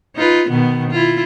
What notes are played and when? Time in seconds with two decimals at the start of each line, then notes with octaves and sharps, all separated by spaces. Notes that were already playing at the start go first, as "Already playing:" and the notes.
0.16 D#4 F4 B4
0.49 B2 D#3 B3
0.91 E4 F4